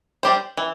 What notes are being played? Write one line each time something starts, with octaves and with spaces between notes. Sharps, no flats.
G3 D4 G4 C5
E3